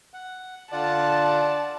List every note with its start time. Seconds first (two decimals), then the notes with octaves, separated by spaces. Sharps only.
0.14 F#5
0.72 D3 F4 D5 F#5 A5